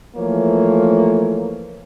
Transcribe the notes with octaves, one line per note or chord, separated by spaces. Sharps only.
E3 F3 A3 A#3 C#5